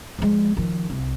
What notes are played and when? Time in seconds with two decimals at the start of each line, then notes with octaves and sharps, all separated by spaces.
0.19 F3 G#3
0.57 D#3 F3
0.90 C2